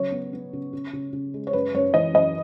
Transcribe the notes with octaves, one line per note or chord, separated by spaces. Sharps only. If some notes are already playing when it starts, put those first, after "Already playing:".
Already playing: C#3 F#3 C#5
B3
B3
C#3
C#3
C#3
C#3
G#3
C#5
F#2 B4
F#2 C#5
E3 D#5
F#2 D#5